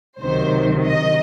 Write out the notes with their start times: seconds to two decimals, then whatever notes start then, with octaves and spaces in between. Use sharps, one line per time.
0.19 C#2 C3 D#3 F#3 C5
0.86 D#5